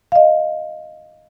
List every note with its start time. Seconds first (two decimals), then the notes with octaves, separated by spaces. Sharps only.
0.12 D#5 F5